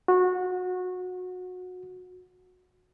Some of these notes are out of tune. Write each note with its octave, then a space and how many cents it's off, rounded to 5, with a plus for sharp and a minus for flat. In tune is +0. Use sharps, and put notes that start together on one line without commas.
F#4 -20